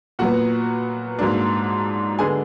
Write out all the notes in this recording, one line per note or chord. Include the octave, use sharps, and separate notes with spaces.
A#2 F#3 B3 F#4 F#5
G#2 F#3 A#3 D4
D3 G#3 B3 D4 G#4 G#5